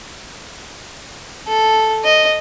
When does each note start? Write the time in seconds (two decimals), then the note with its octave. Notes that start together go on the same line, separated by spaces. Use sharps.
1.47 A4
2.04 D#5